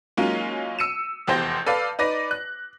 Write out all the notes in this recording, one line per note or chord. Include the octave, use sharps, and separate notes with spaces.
F#3 G#3 A#3 C#4 D#4 F4
E6 C#7 D#7 E7
F1 E2 G4 C5 G6 A#6
A4 B4 D5 F5
D#4 B4 D5 A#6
F#6